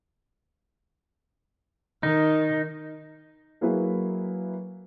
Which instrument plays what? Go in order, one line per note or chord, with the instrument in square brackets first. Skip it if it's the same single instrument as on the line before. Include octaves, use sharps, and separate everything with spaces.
[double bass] D#3 [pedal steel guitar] D#4
[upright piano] F#3 A#3 E4 G#4 A#4 B4